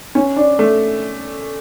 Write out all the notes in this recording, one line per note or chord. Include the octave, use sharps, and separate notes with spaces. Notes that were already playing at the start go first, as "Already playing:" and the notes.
C#4
D4
A3